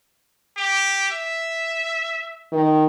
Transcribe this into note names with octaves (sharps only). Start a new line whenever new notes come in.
G4
E5
D#3